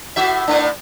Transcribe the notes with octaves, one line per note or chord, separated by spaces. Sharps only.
A2 F#4 E5
A2 A3 D4